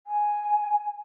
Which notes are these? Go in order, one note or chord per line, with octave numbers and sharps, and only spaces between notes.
G#5